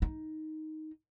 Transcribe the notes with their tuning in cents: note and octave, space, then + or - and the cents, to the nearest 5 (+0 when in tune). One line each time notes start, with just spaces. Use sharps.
D#4 +5